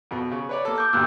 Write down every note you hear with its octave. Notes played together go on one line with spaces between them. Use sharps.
F2 B2
C#3
B4 C#5 D5
A#3 A4
D6 G6
D2 G2 A#2 E6 F#6